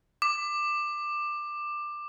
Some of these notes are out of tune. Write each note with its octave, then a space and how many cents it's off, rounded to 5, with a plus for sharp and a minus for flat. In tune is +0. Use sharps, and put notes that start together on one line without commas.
D6 +20